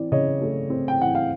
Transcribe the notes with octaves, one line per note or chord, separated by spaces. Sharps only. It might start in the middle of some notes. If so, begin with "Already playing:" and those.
Already playing: E3 C4 D5
C#3 C#5 D#5
A3
C4
G5
E3 F#5
F5